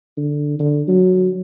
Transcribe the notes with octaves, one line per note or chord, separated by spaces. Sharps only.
D3
D3
F#3